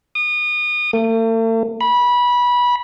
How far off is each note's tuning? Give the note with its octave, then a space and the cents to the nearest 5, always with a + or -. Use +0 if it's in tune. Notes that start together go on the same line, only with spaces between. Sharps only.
D#6 -30
A3 +45
B5 -20